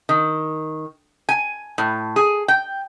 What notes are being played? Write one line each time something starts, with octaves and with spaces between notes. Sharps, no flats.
D#3
G#5
A2
G#4
G5